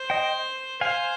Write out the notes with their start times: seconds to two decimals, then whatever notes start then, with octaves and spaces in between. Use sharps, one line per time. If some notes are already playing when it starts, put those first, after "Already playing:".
Already playing: C5
0.10 D#5 G5
0.81 C5 F5 G#5